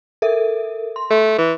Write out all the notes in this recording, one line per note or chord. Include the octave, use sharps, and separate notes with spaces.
A4 A#4 E5
C6
A3
E3